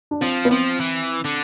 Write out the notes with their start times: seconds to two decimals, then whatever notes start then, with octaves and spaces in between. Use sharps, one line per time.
0.11 D4
0.21 F3 C4
0.45 B3
0.51 F3 C4
0.80 E3
1.25 D3